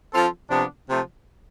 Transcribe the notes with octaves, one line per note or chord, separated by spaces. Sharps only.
F3 C4 F4 A4
C3 F3 B3 D4
C3 F3 A3